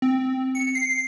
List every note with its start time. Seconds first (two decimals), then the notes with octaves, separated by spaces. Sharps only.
0.02 C4
0.55 C#7
0.75 C7